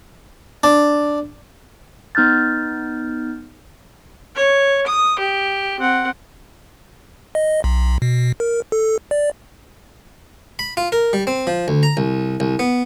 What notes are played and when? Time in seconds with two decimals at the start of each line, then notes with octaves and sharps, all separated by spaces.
0.63 D4
2.15 B3 D#4 F6 G6 A6
4.35 C#5
4.87 D#6
5.19 G4
5.80 C4 F#5
7.35 D#5
7.64 B1
8.02 B2
8.40 A#4
8.72 A4
9.11 D5
10.59 B5
10.77 F4
10.92 A#4
11.13 G3
11.27 C4
11.47 F3
11.68 D2
11.83 A#5
11.97 C2
12.40 C2
12.59 B3